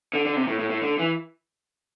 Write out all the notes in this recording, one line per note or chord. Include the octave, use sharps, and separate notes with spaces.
D3
D3
C3
A2
A2
A2
D3
E3